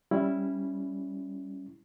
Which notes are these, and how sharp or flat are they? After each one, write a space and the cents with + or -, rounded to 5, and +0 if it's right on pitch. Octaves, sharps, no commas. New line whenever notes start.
G3 +0 C#4 +0 E4 +0